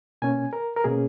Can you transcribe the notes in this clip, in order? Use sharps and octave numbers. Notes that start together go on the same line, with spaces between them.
B2 A#3 C#4 G#5
A#4
A#4
B2 A#3 C#4 G#4